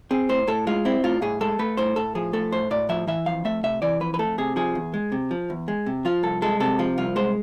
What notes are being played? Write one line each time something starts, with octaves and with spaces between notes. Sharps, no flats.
C4 G#4
A2 C5
A2 A4
G#3 F4
C4 E4
A2 F4
A2 G#4
G#3 A4
A3 B4
A2 C5
A2 A4
F3 G#4
A3 A4
A2 C5
A2 D5
F3 E5
E3 E5
F2 F5
A3 E5
C3 E5
E3 D5
F2 B4
B4
A3 A4
C3 G#4
F3 G#4
E2
G#3
C3
F3
E2
G#3
C3
F3 F4
C2 A4
G#3 A4
C3 A4
F3 F4
C2 F4
G#3 C5